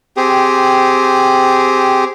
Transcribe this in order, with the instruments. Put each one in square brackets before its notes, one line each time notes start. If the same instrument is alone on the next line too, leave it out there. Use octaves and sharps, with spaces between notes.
[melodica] C4 G4 G#4